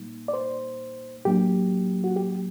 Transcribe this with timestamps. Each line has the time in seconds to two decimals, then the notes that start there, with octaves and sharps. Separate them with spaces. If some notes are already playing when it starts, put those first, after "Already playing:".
Already playing: A#2 G3 A#3 D#4
0.28 D5
0.34 C5
1.25 A2 F#3 A#3 D4 G4
2.04 F#4
2.16 G4